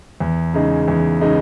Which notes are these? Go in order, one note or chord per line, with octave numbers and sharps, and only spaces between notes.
E2
C#3 G#3 D#4
E2
C#3 G#3 D#4